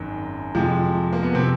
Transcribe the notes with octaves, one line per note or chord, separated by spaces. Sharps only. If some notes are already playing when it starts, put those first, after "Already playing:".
Already playing: G#1 F#2 D#3 G#3
F2 C3 F3 G#3
A#3
B3
C3 C4